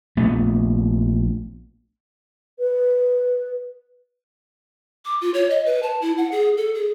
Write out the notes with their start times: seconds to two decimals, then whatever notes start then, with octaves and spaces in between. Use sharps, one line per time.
0.17 A#1 A3 B3
2.59 B4
5.05 D6
5.21 F4
5.34 C#5
5.50 D#5
5.66 B4
5.83 A5
6.02 E4
6.17 F#5
6.32 G#4
6.57 A4
6.75 G#4